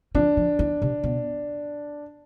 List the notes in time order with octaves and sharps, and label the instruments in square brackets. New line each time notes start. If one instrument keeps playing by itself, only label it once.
[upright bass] F3 [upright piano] D4
[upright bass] F3
E3
C3
B2